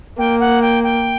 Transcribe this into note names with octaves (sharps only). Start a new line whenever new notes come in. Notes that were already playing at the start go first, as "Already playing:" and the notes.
A#3 G5
F#5
G5
G5